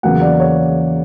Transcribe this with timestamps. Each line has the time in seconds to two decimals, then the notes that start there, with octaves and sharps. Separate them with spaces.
0.03 E2 C#3 F#3 A#3 F#5
0.21 D5
0.40 C#5